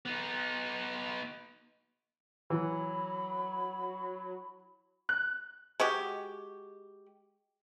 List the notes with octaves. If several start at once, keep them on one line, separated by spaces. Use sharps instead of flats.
B3 D#4
E3 F#3 B5
F#6
G#3 F#4 G4